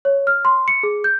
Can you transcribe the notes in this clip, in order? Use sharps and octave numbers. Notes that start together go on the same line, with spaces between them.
C#5
F6
C6
C#7
G#4
G6